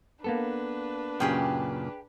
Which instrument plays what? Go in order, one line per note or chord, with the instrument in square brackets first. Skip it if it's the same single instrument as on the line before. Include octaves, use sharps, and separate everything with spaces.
[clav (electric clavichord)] A#3 B3 A4 [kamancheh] D4 B4
[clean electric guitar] F#2 A#2 C#3 [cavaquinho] G4 G#4 G5